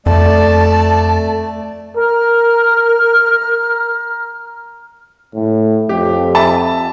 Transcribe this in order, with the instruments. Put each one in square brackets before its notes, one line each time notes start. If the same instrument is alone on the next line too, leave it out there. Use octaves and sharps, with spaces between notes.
[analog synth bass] F2 [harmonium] A3 [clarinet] D5 [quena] A5
[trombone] A#4 [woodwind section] A#5 F6
[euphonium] A2
[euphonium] F2 [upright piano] G4
[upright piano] E5 A5